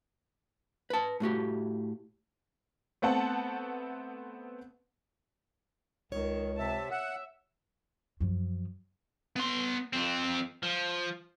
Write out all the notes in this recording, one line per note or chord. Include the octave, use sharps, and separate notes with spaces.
B4 A5
A2 A3 F#4 G4
A3 B3 C4 F#5 A5
C#2 D#3 C#5
C3 E5 A5
E5 F#5
F#2 F3
B3 C6
F2 C4
F3